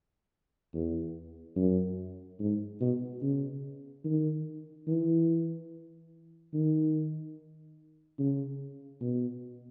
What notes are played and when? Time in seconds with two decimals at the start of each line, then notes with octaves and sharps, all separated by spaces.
0.74 E2
1.56 F#2
2.40 G#2
2.81 B2
3.22 C#3
4.05 D#3
4.88 E3
6.53 D#3
8.19 C#3
9.01 B2